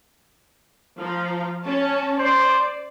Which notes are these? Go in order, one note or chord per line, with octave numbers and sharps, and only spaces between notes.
F3 F5 A#5
C#4 C#5 A5
C5 D5